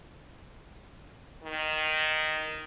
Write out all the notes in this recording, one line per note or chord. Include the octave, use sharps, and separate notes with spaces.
D#3